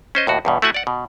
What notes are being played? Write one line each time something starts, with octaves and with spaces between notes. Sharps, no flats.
C#4 C5 D#5
D#2 A2 F#4
E2 G2 B2
A3 E4 F#4 F#5 G#5
D5 F#5
B2